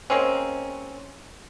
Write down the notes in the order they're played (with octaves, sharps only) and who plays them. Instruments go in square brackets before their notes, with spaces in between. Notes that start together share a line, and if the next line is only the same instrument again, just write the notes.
[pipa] G#3 A#3 C4 C#4